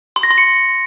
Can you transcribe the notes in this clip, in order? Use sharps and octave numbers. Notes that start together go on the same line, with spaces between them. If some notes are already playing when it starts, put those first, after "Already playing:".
C6
A#6
C6
C#7